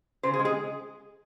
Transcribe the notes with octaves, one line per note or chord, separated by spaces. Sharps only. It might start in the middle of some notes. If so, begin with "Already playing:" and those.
C#3 C5
G#4
G#3
G#4